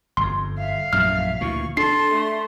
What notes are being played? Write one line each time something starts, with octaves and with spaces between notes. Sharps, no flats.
G1 F2 C6
E5 F5
A#1 F#2 A2 E5 F6
D2 A#2 E3 C#6
D4 A4 C6 C7
A3